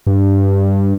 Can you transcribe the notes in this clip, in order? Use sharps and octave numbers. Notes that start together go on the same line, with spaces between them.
G2